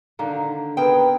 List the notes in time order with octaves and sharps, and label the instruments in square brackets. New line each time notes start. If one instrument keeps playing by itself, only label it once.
[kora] D3 D#3 A#3
[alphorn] B3 [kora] C4 G#4 A#4 [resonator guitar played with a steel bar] G5